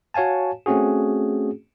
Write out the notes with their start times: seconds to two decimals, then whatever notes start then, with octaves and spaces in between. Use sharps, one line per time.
0.14 F#4 C#5 F5 G#5 A5
0.66 A3 C4 C#4 F#4 G#4